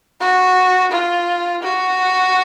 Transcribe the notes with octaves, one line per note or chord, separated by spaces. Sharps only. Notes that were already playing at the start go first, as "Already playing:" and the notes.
F#4
F4
F#4